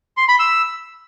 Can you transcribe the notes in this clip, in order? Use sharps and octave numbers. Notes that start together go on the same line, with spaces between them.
C6
B5
E6